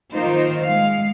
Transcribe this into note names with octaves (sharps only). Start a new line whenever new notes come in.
D#3 A#3 D#4 F4 C5
G#3 F5